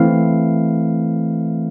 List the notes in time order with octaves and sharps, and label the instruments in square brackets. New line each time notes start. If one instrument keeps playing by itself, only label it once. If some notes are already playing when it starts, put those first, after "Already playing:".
Already playing: [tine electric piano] E3 A3 C4 E4 F5